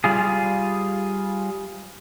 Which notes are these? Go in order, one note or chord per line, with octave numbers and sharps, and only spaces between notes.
G3 F4 G#4